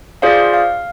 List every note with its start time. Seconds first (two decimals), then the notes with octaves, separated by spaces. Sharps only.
0.22 F4 G#4 C5 D5 F5
0.54 F5